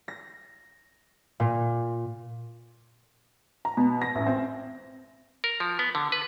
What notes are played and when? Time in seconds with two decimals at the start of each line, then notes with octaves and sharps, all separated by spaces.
0.08 A#6
1.40 A#2
3.65 A#5
3.77 B2
4.02 A#6
4.15 A1
4.26 C4
5.44 A#4
5.60 F3
5.79 B3
5.95 D3
6.12 B4